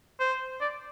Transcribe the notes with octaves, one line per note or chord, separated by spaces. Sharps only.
C5
D5